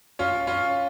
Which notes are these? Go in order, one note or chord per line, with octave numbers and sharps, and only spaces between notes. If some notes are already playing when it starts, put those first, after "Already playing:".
C#4 F4
C#4 F4